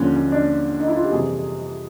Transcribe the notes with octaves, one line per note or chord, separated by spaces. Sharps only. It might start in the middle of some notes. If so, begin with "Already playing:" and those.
Already playing: D#2 D3 F3 C#4
C#4
D4
D#4
E4
F4
G4
F2 C3 E3 G3 G#4